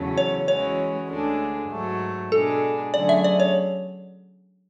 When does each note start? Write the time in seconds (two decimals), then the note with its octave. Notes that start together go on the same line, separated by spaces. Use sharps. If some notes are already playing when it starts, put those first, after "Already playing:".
Already playing: E2 C#3 F#3 A3 C#4
0.18 C#5
0.48 E3 G#3 C#4 F#4 C#5
1.09 D2 D3 G#3 D4
1.70 G#2 F#3 A3
2.32 B2 G#3 D4 A4
2.94 D3 F#3 A3 C#4 G#4 D5
3.09 E5
3.24 D5
3.40 C#5